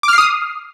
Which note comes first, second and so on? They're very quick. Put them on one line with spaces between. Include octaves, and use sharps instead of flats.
D6 F6 C7 D#6